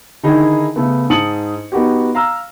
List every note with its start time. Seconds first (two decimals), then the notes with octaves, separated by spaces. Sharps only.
0.23 D3 D#3 D#4 E4 G#4
0.76 C#3 A3 B3
1.10 G#2 A5 D#6 C#7 F#7
1.72 B3 D#4 F#4 G4
2.15 F5 A#5 E6 F6